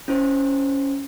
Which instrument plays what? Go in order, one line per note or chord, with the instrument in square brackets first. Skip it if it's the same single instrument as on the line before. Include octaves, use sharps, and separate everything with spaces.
[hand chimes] C#4 E4 C5